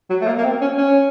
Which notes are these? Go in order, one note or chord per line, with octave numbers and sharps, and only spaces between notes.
F#3
A3
A#3
A#3
C4
C#4
C#4